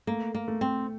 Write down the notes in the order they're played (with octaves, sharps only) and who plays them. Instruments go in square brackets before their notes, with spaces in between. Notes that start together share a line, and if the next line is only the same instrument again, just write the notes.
[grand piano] A3 [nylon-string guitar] A#3
[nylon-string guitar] A#3
[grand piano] A3
[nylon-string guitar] C4